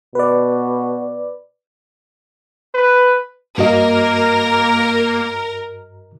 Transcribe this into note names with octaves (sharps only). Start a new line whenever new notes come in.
B2 B4 D5
B4
G2 A#3 F#4 A#4 D#5